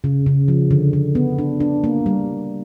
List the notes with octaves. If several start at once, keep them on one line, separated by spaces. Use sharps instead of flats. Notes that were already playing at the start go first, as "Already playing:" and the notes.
C#3
C#3
F3
D3
D3
B3
D4
D4
A#3
G3